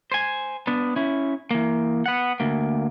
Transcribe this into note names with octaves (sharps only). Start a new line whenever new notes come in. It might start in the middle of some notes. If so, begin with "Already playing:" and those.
C5 G#5
B3 D4
C#4 E4
E3 A#3
B3 F#5
D2 A#3